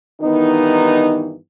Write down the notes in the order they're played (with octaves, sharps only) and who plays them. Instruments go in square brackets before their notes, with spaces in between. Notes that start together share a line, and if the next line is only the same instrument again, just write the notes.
[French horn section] G2 D#3 E3 B3 D#4